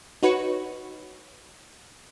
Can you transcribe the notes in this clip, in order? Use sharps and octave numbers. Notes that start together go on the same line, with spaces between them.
D#4 F#4 B4 C#5 C#7